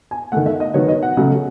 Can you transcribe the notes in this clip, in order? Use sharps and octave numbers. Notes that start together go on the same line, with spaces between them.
G#5
D#3 A3 F#5
E5
D#5
D#3 F#3 B3 C#5
D#5
F#5
C#3 F#3 A3